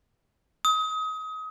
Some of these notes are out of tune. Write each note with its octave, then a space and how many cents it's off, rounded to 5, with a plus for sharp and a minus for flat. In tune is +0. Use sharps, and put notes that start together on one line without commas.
D#6 +25